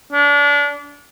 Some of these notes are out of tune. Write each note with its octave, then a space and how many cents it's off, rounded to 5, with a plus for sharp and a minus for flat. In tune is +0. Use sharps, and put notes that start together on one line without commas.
D4 -30